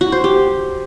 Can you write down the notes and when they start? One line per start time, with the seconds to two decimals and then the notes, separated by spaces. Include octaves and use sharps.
0.01 F#4
0.12 C5
0.24 G4